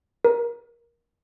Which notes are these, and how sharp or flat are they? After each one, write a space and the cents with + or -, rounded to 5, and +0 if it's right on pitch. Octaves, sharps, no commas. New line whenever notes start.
A#4 +20